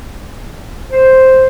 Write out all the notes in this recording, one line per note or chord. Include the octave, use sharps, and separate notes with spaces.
C5